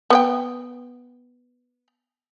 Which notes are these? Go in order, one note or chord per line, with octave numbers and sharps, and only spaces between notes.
B3 B4 G5